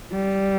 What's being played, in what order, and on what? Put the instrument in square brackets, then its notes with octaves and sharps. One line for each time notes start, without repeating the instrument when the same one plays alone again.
[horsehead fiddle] G3